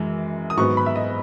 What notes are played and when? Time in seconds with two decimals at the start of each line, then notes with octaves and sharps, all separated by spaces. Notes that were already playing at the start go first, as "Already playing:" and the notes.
Already playing: F#2 E3 G#3
0.50 D#6
0.57 G#2 F#3 B3 C#6
0.77 B5
0.86 E5
0.96 D#5